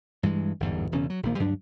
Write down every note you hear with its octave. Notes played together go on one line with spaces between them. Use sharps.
G2 E3 G#3
G1 E2 G#2
E1 E2 C#3 C#4
F#3
A#1 D#3 F3 A#3
D2 G2 F#3 D4